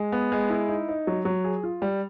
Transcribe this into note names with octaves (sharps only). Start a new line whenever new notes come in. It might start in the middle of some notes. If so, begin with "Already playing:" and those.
Already playing: G#3
B3
G#3
E4
D#4
D#4
F#3
F#3
G#4
F4
G3